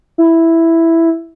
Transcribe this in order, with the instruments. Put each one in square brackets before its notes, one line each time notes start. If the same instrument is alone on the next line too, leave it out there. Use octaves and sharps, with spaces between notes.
[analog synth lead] E4